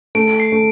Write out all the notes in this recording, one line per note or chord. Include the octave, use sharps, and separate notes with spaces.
A3 D7
C7
A3